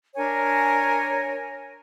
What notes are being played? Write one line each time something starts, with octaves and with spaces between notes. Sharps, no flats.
D4 A#4 C#5 G#5